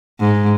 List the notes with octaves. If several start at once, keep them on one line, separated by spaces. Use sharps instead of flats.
G#2